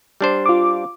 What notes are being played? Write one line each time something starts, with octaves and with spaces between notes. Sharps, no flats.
G3 D4 C5
F4 D6